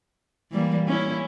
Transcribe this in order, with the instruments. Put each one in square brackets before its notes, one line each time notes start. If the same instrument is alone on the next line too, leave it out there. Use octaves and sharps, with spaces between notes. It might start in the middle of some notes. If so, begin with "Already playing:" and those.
[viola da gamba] E3 G3 A#3
C#4 E4